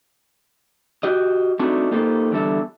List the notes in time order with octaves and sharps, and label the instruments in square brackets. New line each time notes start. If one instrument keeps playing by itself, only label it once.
[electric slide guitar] F#4 G4 D#5
A3 C4 D4 D#4 F#4
A#3 D#4 F4 G4 A4 C5
E2 D3 G3 A4 E5